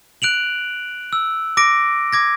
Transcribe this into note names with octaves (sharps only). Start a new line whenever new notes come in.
F#6 D7 F7 F#7
E6
D6 A#6 D7
D6 G#6 A#6